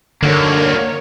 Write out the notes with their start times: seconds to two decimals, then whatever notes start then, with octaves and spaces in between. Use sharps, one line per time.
0.22 D3 D#3 A#3 F#4 A#4 C#5